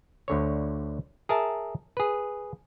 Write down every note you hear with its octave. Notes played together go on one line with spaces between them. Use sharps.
D2 D3 C#5
G#4 A#4 E5 A5
G#4 B4